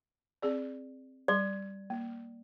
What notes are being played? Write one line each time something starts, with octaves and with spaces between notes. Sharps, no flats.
C4 G#4 D5
G3 D5 C6
A#3